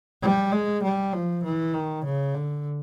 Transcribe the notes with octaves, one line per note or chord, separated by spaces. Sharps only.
G3
G#3
G3
F3
E3
D#3
C#3
D3